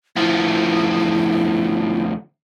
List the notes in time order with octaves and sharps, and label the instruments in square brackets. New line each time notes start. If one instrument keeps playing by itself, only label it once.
[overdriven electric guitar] D2 F3 [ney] E4